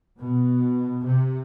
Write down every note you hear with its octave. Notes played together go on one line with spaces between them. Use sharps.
B2
C3